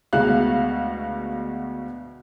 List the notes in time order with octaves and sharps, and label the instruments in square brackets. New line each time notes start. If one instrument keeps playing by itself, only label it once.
[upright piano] D2 B2 G#3 F#4 F5 F#6